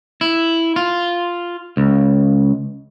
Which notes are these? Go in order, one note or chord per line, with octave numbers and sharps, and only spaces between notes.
E4
F4
C#2